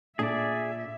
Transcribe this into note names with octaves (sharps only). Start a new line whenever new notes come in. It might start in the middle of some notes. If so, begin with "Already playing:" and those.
A#2 D4 G#4 A4 D5 E5